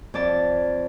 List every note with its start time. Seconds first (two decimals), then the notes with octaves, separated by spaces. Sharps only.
0.14 F2 D5 A5